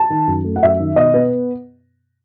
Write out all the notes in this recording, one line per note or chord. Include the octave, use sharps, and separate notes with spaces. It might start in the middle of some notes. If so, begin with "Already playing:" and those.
Already playing: A5
D#3
F#2
A3
F#5
F#2 E5
D#3
B2 D#5
B3